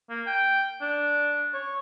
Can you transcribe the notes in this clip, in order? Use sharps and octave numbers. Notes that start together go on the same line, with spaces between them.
A#3
G5
D4
C#5